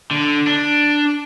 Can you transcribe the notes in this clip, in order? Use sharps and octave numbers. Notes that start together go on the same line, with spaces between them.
D3
D4